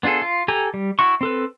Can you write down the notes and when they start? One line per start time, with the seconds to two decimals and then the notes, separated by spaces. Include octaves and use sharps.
0.03 B3 D4 F4 G#4 A4
0.22 F4
0.48 G4 A4 G#5 A#5
0.74 G3
0.99 E4 F#4 C#6
1.21 C4 A4 B4